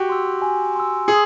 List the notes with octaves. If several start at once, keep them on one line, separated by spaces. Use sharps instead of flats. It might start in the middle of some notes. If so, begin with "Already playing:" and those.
Already playing: F#4 G4
C6 E6
G#5
C6 E6
G#4 D#6